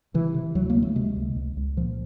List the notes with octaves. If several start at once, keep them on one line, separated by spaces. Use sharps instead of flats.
C3 E3
C3
D2 F#3
A#3
D2
A3
C3 G#3
C#2
C#2
C#2
A#2 F3